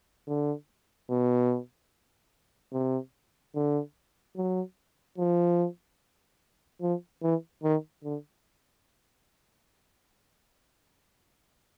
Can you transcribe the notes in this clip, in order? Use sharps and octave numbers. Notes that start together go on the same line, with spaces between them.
D3
B2
C3
D3
F#3
F3
F3
E3
D#3
D3